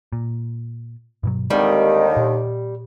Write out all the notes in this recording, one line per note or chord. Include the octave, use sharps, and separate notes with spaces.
A#2
G2 B2 F#3
D#2 D3 D#3 G3 G#3 C4
A#2